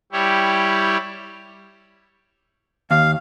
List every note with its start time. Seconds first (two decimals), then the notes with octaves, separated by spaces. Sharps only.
0.12 G3 E4 G4 C#5
2.91 D#2 F5